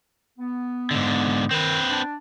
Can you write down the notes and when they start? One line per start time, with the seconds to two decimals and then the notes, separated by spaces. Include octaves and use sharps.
0.39 B3
0.91 G#2 D3
1.51 D#3 C4 B4
1.89 D4